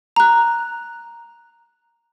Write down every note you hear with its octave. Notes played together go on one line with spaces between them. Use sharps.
A#5 F#6